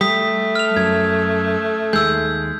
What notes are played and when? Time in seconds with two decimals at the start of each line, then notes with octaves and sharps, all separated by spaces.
0.01 G3 A3 D#6 B6
0.55 F6 F7
0.76 F#2 G#6
1.93 D#2 G#3 E6 G6